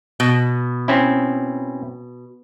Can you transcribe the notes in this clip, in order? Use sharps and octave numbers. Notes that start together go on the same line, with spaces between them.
B2
C4 C#4 E4